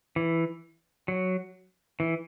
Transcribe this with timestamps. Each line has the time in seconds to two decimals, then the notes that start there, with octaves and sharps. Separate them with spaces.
0.16 E3
1.08 F#3
2.00 E3